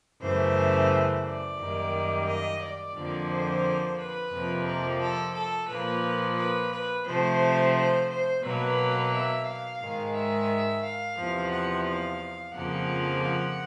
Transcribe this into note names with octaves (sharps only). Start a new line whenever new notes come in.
F#2 C#3 E3 A3 C5
D5
F#2 D#3 G3 A#3
D#5
D5
F2 D3 F3 A#3
C5
B4
F2 C3 F3 A#3
A#4
A4
A4
A#2 F3 A#3 B4
B4
B4
C3 F3 A3 C5
C5
C5
B2 F#3 A#3 B4
E5
F5
G#2 D#3 G#3
E5
F5
E2 C3 F3
F#5
F5
F2 C#3 F3 A#3 F#5
F#5